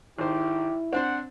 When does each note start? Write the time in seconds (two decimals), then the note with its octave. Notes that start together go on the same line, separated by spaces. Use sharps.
0.19 G#1 D#3 E4 G4 C5
0.93 C4 D4 C5 F#5